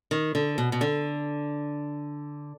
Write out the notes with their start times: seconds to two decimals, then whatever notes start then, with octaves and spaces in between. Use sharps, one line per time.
0.11 D#3
0.35 D3
0.58 B2
0.72 B2
0.81 D3